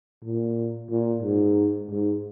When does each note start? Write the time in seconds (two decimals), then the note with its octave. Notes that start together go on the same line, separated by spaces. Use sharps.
0.24 A#2
0.90 A#2
1.23 G#2
1.90 G#2